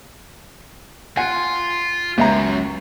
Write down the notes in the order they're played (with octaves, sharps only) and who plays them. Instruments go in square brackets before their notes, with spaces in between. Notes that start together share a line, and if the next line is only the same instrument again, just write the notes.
[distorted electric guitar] F4 [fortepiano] F#5 G#5
[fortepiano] C#2 E5 A#5 [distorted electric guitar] F#2